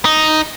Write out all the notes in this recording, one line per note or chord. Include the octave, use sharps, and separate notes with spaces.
D#4